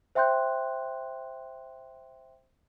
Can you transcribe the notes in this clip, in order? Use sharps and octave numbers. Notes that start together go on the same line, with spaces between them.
C5 E5 G5 C6 F#6 G6